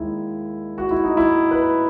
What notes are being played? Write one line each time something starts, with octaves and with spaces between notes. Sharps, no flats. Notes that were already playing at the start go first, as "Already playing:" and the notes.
Already playing: D#2 D#3 G#3 E4
F#4
E4
D#4
E4
B4